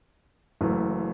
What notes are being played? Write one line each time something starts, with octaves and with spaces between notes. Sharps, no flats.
F#1 F#2 E3 A3